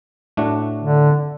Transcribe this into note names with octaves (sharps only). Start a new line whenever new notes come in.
A2 A3 D4 F#4
D3